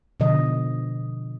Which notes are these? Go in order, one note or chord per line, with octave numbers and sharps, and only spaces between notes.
B2 D3 F3 D#5